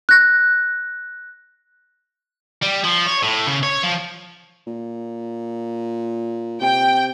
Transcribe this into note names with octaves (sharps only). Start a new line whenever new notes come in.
F#6 A#6
G3
F3
C#5
A2
C#3
C#5
F3
A#2
C3 G5